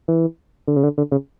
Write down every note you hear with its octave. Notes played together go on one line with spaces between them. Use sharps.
E3
D3
C#3
D3
D3
C#3